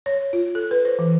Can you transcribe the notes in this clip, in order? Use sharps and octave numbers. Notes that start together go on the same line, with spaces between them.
C#5
F4
A4
B4
C5
E3